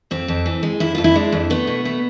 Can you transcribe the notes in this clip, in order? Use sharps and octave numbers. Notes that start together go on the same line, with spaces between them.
F2 C4
F2
E3
G#3
F2 E4
F2 F4
E4
G#3 D4
F2
A3 B3
B2
A3